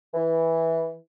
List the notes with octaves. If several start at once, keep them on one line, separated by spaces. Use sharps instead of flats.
E3